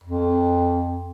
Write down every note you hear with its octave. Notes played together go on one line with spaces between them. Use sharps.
F2